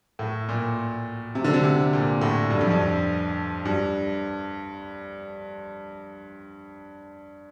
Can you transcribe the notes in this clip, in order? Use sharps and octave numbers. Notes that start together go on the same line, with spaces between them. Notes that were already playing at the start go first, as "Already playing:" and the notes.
A2
A#2
C3
D3
C3
C3
A#2
A2
G2
F2
G2
G2